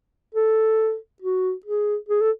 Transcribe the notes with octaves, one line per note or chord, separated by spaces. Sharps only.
A4
F#4
G#4
G#4
A4